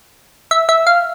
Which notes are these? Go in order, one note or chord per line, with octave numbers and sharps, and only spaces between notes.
E5
E5
F5